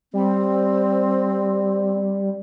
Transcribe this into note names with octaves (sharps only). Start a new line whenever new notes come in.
G3 C4